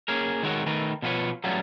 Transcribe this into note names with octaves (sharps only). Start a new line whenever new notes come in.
A#3 C#4 G#4 A#4
D#3 G#3 E4 F#4 A#4 C#5
D#3 A3 A#4 B4
B2 F3 F4 F#4 B4 C#5
F#3 G3 A3 B3 C#4 F4